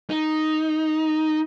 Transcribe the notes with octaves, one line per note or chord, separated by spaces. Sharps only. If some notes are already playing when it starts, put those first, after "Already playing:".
D#4